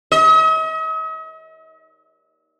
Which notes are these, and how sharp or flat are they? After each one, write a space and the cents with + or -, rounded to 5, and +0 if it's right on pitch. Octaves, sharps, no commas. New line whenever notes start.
D#5 +45